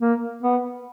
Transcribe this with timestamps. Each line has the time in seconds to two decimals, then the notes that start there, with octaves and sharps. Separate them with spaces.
0.01 A#3
0.43 B3